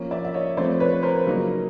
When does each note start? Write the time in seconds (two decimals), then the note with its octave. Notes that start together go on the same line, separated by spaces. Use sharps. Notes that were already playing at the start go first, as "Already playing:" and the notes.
Already playing: F3 A#3 C#4
0.11 D5 E5
0.25 E5
0.34 C#5 D#5
0.57 F3 A3 C4 C5 D5
0.80 B4 C#5
1.03 A#4 C5
1.26 C#3 F#3 A#3 D#4